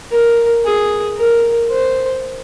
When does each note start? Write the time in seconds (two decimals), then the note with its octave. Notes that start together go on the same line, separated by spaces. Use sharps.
0.11 A#4
0.65 G#4
1.17 A#4
1.71 C5